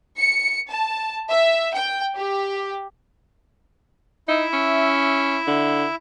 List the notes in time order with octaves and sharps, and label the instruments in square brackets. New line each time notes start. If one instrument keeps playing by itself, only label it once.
[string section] C#7
A5
E5
G5
G4
[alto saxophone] D#4 [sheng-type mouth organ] E4 E5
[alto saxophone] C#4
D3